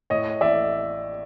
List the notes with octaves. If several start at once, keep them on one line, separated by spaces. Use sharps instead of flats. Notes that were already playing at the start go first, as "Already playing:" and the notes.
A2 C#5 D#5
A1 D5 E5